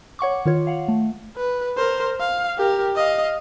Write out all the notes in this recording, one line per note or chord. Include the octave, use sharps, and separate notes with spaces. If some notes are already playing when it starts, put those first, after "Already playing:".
C#5 F#5 C#6 D6
D#3 F4 C#5
F5 F#5
A3
B4
A#4 C5
F5
G4 A#4
D#5 F5